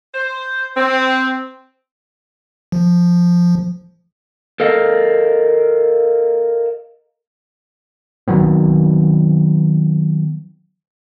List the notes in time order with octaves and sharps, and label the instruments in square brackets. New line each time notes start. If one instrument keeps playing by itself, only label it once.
[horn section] C5
C4
[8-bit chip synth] F3
[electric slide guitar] A4 A#4 D#5 F5
[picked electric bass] D#3 F#3 B3 C4